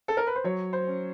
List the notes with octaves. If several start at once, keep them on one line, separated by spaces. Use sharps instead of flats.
A4
A#4
B4
C5
F#3 C#5
C5
C#4